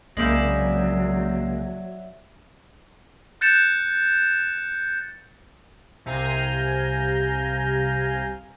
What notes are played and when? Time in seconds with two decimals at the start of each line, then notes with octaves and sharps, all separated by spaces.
0.17 C2 C#3 F#3 G#3 A#3 D5 E5 G6
3.41 F#6 G6 A6 C#7 E7
6.05 C2 C3 F5 G#5 A#5 G6